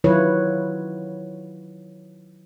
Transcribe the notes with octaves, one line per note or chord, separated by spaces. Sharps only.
D#3 F#3 E4 F4 B4 C#5